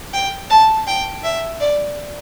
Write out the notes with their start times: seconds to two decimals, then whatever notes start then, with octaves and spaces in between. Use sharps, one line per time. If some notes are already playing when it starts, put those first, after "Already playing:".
0.13 G5
0.50 A5
0.87 G5
1.24 E5
1.60 D5